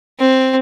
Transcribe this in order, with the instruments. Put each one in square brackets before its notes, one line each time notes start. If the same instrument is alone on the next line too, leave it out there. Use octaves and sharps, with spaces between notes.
[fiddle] C4